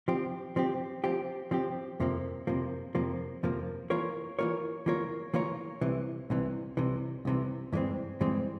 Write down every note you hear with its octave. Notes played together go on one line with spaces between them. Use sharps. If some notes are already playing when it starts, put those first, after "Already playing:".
F3 C4 G4
F3 C4 G4
F3 C4 G4
F3 C4 G4
F2 C3 F3 A#3
F2 C3 F3 A#3
F2 C3 F3 A#3
F2 C3 F3 A#3
E3 A#3 F4 A#4 C#5
E3 A#3 F4 A#4 C#5
E3 A#3 F4 A#4 C#5
E3 A#3 F4 A#4 C#5
C2 C3 E3
C2 C3 E3
C2 C3 E3
C2 C3 E3
G2 E3 G#3 C4
G2 E3 G#3 C4